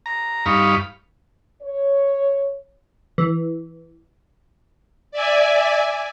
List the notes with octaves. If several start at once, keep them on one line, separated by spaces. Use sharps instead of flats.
A#5
G2 D#4 F5 B5 C#6
C#5
E3
D5 E5 G#5